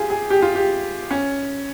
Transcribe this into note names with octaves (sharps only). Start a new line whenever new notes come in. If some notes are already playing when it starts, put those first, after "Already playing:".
Already playing: F4 G4 G#4
G#4
G4
F4
G4
C#4